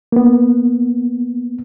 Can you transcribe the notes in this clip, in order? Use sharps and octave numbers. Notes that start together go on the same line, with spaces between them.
A#3 B3